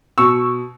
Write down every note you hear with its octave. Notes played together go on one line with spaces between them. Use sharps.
B2 C#6 E6